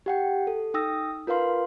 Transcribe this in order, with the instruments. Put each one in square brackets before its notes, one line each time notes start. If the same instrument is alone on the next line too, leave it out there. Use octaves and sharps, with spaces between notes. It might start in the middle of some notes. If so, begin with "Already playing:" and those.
[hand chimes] G4 F#5 G5
A4
D#4 G5 D#6 E6 A#6
F4 A#4 B4 F5 C6